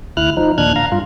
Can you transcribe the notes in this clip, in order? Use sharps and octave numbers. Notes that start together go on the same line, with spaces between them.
D2 E4 F6 F#6
F3 D#4
D#2 A#2 D4 F6 F#6 G#6
F5 A#5
G2 F4